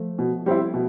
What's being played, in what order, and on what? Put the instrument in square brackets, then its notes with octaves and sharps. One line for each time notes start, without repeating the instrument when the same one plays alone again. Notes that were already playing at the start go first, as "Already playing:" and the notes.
Already playing: [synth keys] F3 A3
[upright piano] B2
G3 C4 E4
B2